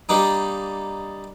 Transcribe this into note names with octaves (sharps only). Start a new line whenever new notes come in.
G3 A#3 D4 D#4